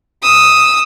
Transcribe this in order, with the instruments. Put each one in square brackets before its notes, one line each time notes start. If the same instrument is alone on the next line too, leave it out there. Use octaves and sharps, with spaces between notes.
[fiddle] D#6 E6